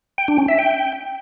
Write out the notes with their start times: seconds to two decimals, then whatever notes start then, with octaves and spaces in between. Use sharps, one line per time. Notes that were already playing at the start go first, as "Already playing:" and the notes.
0.18 G5
0.28 D4
0.38 C#4
0.48 E5
0.59 G5